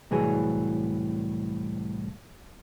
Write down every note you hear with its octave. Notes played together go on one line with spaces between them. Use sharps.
C2 A2 E3 F#3 G#4